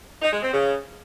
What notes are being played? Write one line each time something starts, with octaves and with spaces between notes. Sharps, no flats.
D#4
G#3
C4
C#3